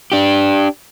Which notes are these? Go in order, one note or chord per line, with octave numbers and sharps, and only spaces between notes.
D4 G4